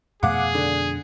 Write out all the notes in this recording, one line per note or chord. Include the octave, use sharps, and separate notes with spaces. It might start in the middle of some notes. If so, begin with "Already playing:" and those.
F2 B2 A3 G#4 F5 F#5 D6
D3